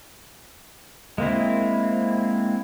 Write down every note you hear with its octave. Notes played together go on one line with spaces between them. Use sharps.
G#3 A#3 C4 E4